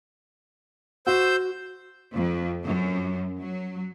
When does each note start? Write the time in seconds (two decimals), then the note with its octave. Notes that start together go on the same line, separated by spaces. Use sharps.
1.07 F#4 C5 E6 G6
2.14 F2
2.65 F#2
3.40 F#3